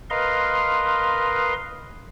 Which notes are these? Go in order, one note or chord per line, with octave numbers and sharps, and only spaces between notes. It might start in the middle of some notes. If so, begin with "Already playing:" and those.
A#4 B4 D#5 F5 C6